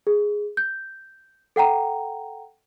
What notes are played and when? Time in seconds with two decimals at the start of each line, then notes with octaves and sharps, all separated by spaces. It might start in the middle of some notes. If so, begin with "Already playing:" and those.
0.07 G#4
0.57 G6
1.56 A4 F#5 G5 A#5